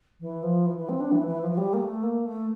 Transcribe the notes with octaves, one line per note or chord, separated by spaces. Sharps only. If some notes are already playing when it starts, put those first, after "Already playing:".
E3
F3
E3
E3
C4
D4
E3
E3
F3
F3
G3
A#3
A3
A#3
A3